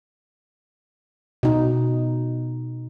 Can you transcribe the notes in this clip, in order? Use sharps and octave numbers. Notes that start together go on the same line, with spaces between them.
B2 D#4